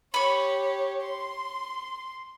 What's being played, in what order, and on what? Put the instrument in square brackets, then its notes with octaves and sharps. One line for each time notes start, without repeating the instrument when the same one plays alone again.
[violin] G4 C#5 [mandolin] B5 C#6
[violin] C6